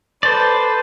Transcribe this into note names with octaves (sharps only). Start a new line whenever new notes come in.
A4 B4 C5 D5